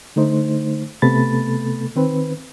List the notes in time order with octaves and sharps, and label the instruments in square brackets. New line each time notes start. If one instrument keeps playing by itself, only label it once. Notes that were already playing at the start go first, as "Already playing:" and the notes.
[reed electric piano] D3 A3 D#4 C5
C3 A3 B3 A4 B5 A6
D#3 C4 B4